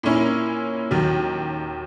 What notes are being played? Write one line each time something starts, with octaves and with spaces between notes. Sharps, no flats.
A#2 A#3 C#4 E4
D#2 D#3 F#3